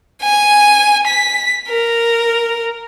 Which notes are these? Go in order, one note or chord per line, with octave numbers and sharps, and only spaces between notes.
G#5
B6
A#4